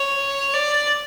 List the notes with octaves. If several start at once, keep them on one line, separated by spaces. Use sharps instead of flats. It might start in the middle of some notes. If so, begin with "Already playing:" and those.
Already playing: C#5
D5